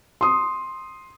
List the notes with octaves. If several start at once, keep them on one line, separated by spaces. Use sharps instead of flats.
C6 D#6